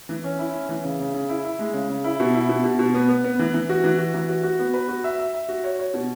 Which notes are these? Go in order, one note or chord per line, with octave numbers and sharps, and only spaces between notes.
E3
C#4
E4
C#4
E3
C#3
C#3
C#3
E4
E4
G#3
C#3
C#3
E4
B2
E4
B2
B2
B2
B3
B3
B3
E3
E3
F#4
E3
F#4
E3
F#4
F#4
B3
B4
F#4
E5
E5
E5
F#4
C#5
C#5
B2